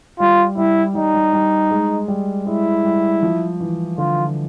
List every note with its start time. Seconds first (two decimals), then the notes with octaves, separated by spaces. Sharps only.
0.20 G3 F4
0.58 G3 E4
0.95 G3 D#4
1.14 G3
1.33 G3
1.71 G#3
2.08 G3
2.46 G#3 E4
2.85 G3
3.23 F3
3.60 E3
3.98 D3 F4